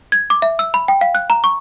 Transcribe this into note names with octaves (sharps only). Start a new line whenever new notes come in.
G#6
D6
E5
E6
B5
G5
F5
F#6
A#5
C#6